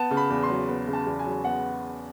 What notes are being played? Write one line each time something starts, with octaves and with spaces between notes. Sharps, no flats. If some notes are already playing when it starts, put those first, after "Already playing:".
Already playing: B3 A5
C#3
B5
E2
C6
F#3
B3
C#3
A5
E2
G#5
F#3
B3 F#5